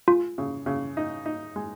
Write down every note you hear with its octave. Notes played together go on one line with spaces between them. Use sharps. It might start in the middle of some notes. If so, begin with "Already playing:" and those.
G#3 F4
C#3
C#3
D#4
D#4
G#3